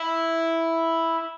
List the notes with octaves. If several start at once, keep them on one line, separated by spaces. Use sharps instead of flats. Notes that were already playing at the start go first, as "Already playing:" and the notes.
Already playing: E4